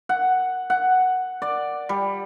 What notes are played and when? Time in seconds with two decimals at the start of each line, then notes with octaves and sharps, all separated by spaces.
0.09 F#5
0.70 F#5
1.42 D5
1.89 G3